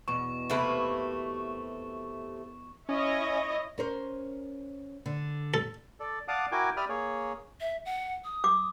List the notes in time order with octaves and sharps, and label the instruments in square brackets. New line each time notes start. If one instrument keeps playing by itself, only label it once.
[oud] E2 B2 [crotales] C#6
[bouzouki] C3 A3 [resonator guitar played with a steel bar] A#3 E4 B4
[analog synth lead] C#4 [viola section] E4 C#5 D#5
[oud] C#4 A#4 C5
D3
[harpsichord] A4
[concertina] A4 D5
D5 F5 F#5 A5 D6 D#6
E4 F#4 A#4 G5 G#5 D6
G4 D5 E5 B5 D#6 F6
A#3 G#4 C#5
[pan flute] E5
F#5
D#6
[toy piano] D6